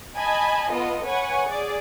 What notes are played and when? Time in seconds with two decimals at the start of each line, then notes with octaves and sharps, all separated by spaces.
0.16 D#5 G#5 A5 B5
0.70 B3 F4 A4 D#5
1.04 B4 C#5 F#5 G#5 C#6
1.48 G#4 D5